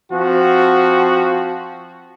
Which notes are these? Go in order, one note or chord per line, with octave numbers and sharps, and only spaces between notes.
F3 C4 F#4